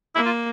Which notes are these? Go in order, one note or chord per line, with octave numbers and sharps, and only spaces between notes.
A#3 E4
F4